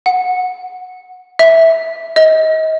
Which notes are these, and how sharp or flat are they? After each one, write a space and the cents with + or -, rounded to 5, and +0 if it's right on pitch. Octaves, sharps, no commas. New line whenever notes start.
F#5 -15
E5 -10
D#5 +30